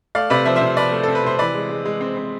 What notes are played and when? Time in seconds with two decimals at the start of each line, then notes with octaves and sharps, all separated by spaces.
0.15 A3 D5 F5
0.30 C3 B4 D5
0.45 F3 C5 E5
0.56 C5 E5
0.61 C3
0.77 F3 B4 D5
0.92 A3
1.04 C4 A4
1.15 B4
1.23 C3 C5
1.39 E3 B4 D5
1.54 G#3
1.70 G#3
1.85 G#3
2.01 C4
2.16 C4